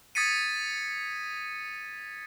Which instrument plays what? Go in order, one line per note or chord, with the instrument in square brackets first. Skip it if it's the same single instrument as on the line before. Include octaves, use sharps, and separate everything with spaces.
[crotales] D#6 G#6 A6 B6 C#7 D#7